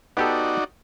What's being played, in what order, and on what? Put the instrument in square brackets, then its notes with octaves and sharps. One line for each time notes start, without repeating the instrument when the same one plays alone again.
[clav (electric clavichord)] B3 G4 A4 [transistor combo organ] D#4 F#4 D5